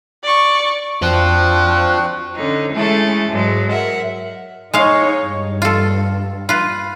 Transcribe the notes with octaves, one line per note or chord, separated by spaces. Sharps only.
D5 C#6
F2 C4 D4 F4 F#4 C5 F#6
D3 C#4 D#4
E3 G#3 A3 C#4 A4
G#2 F#3 G#3
A#4 E5 F#5
G#3 D#4 C#5 F5
G2
F4 A4
F4 B4